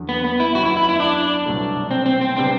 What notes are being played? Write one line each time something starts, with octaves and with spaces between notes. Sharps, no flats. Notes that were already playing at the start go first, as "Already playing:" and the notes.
Already playing: E2 D3 F#3
B3
B3
E4
F#2 E3 B3 F#4
E4
E4
E4
D4
C2 B2 F#3 A3
C4
C4
C4
C3 G3 B3 C4 D4